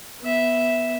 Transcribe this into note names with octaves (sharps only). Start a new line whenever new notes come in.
B3 E5